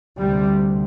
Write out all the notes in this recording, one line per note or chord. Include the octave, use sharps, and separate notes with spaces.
D2 C3 G3